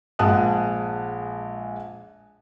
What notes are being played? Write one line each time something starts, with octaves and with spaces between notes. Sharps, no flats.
A#1 G#3 F#5 A5 D#6 F#6